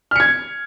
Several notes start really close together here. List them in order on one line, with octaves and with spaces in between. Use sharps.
F6 C#7 G#6